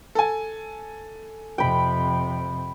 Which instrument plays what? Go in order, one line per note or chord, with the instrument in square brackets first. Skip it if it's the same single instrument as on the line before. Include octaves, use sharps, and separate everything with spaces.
[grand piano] A4 G#5
[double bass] F2 C3 [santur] G5 B5